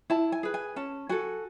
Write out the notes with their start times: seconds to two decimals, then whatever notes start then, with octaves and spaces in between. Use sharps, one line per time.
0.10 E4 A5
0.32 G#5
0.43 G#4 B4
0.54 G#5
0.76 C#4 A5
1.09 F#4 A4 G#5